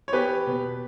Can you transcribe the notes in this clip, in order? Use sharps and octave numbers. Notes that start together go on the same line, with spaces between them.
C#5
E2 G4 B4
B2